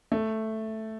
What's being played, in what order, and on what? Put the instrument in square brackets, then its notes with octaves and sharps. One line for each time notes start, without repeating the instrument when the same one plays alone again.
[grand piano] A3